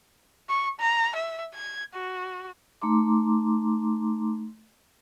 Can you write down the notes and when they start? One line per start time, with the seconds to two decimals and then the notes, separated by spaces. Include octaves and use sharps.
0.49 C#6
0.80 A#5
1.15 E5
1.54 G#6
1.94 F#4
2.82 A3 D#4 A#5 C6 D6